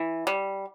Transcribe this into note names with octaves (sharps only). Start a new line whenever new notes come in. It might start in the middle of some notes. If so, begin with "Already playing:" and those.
Already playing: E3
G3